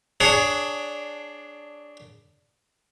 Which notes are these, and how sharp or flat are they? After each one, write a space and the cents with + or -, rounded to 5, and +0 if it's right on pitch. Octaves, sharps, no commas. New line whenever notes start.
D4 +0 G#4 +0 C#5 +20